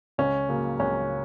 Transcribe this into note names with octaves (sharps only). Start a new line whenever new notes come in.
C#2 C#4
C#3 F#3 A#3
C#2 C#4